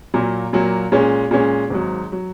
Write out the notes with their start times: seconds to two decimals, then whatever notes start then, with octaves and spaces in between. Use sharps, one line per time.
0.14 A#2 F#3 A#3
0.53 A#2 F#3 A#3
0.92 A#2 G#3 C#4
1.31 A#2 G#3 C#4
1.70 G#1 G#2 F#3
2.12 F#3